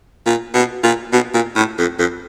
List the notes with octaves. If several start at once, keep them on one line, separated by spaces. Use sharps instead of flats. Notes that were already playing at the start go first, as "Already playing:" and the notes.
A#2
B2
A#2
B2
A#2
A2
F2
F2